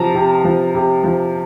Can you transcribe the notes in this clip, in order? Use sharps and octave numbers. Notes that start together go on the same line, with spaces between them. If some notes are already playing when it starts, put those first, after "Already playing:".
Already playing: C3 F3 A5 A#5
C3
F3
C3
F3